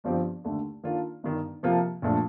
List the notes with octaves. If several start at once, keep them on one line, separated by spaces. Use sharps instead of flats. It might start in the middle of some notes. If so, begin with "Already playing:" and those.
G1 G2 F3 C4 G4
D#2 D3 A3
D#3 A#3 D4 F4 A4
G1 G2 D#3
C3 F3 A#3 F4 A4
A#1 A#2 A3 D4 A4